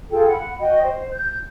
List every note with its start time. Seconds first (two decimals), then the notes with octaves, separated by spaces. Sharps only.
0.11 F4 G#4 A4 G5
0.27 F#5 B5
0.59 F#4 D#5 G5
0.82 C5
1.12 G6